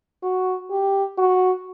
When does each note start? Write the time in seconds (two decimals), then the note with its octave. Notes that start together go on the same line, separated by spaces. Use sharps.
0.23 F#4
0.71 G4
1.18 F#4